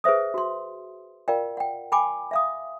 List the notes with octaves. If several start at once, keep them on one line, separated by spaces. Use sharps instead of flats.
G#4 B4 C5 E5 D#6
F#4 C6
F4 A#4 D5 F5 G5
F#5 G5
G5 G#5 B5 D6
E5 F5 D#6